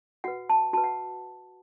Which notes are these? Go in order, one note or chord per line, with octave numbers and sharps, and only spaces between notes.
F#4 B4 F#5
A5
F#4 B4 A5
F#5